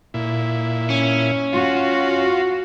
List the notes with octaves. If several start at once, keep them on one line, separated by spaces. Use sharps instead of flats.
A#2 E4
C#4
F4 F#4